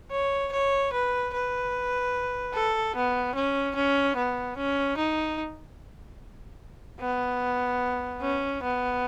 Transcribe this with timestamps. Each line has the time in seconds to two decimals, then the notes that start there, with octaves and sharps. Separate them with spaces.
0.11 C#5
0.53 C#5
0.93 B4
1.33 B4
2.54 A4
2.96 B3
3.35 C#4
3.76 C#4
4.16 B3
4.57 C#4
4.97 D#4
7.00 B3
8.22 C#4
8.63 B3